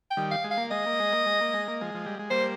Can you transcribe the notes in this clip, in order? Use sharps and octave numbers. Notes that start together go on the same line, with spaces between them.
G5
D#3 G3
F5
G#3
F5
A#3
G#3 D#5
A#3
G#3
A#3
G#3
A#3
G#3
A#3
F3 G#3
F3
G3
G#3
G3 A#3 C5